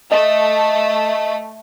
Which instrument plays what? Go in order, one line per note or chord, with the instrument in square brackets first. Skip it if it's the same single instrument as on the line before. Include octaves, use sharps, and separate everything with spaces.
[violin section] A3 [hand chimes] D#5